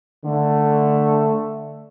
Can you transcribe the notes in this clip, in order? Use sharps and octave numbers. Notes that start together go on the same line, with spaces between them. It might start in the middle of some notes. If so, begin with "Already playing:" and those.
D3 A3